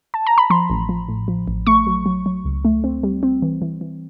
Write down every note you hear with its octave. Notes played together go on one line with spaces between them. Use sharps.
A5
A#5
B5
F3 C6
A1
F3
A2
F3
A1
A3 C#6
F#3
F#3
F#3
C#2
A3
C4
G3
C4
E3
E3
E3